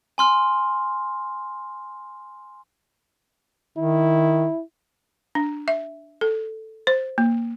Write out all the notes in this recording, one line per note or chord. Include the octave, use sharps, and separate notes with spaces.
G#5 C6 F6
D#3 E4
D4
E5
A4
C5
A#3